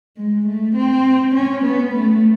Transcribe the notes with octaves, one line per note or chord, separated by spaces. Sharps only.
G#3
A3
C4
C#4
B3
A3